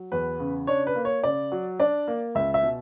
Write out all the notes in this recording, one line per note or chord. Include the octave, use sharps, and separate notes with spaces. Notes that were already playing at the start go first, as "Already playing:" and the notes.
Already playing: F#3
E2 B4
C#3
D4 C#5
B4
A#3
C#5
C#3 D5
F#3
D4 D5
A#3
C#2 E5
E5
B2